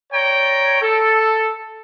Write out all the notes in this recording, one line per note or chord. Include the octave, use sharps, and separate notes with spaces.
C#5 D5 G5 A#5
A4